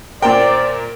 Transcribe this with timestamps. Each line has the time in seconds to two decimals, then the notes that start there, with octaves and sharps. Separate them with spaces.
0.22 A#2 A#4 C5 D5 G5